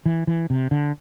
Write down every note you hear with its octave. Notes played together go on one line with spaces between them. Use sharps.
E3
E3
C3
D3